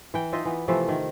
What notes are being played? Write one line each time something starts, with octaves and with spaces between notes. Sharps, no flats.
E3 G5
D#4 F4 D#5 E5
E3 B3
C3 E3 F3 A3
D#3